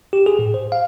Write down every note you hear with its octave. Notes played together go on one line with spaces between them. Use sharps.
G4
G#4
A2
C5
F5